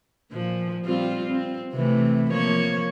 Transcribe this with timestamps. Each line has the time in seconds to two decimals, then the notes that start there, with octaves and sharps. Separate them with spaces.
0.31 A#2 F3
0.86 G3 C4 F4
1.31 C4
1.74 C3 E3 A3
2.30 F3 A#3 C#5